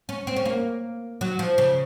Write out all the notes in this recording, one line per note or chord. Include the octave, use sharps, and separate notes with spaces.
C#4
C4
C#4
A#3
F#3
F3
C#3